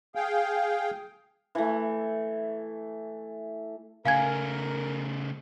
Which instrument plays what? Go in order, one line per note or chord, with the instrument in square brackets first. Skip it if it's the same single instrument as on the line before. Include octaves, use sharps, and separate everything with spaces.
[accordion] G#4 F5 G5
[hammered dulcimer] E3 A3
[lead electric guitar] C#3 A3 [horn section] A#4 [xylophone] F5 G#5 G#6